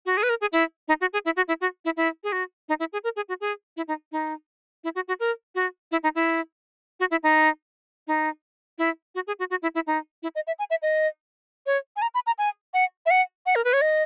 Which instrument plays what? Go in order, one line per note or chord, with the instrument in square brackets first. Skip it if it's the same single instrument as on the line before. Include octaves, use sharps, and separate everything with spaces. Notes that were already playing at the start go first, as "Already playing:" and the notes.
[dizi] F#4
G#4
B4
A#4
G#4
E4
D#4
F#4
G#4
E4
F#4
E4
F#4
E4
E4
G#4
F#4
D#4
E4
G#4
A#4
G#4
F#4
G#4
E4
D#4
D#4
E4
F#4
F#4
A#4
F#4
E4
D#4
E4
F#4
E4
D#4
D#4
E4
F#4
G#4
F#4
F#4
E4
E4
D#4
E4
D#5
E5
G#5
E5
D#5
C#5
G#5
A#5
B5
A#5
G#5
F#5
E5
F#5
F#5
A#4
B4
C#5
D#5